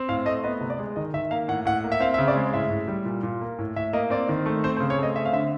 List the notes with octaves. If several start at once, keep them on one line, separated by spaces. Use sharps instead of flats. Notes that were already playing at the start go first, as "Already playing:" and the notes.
Already playing: C4
A2 F5
A3 D#5
B3 D#5
C3
D5
G#3
D#3 D#5
D#3 E5
A#3 F5
A2 F#5
A2 F#5
A#3
E5
C4 F5
E5
C#3
D5
G#3
A2 E5
A2
G3
A#2
A#2
A#3
A2
A2 E5
A#3 D#5
C4 D5
D#3
A3
C4 C5
C5
C#3
C#5
A3 D#5
C4 E5
F5
D3 E5